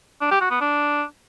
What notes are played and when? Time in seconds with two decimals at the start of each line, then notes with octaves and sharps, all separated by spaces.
0.21 D4
0.31 G4
0.41 F#4
0.51 B3
0.61 D4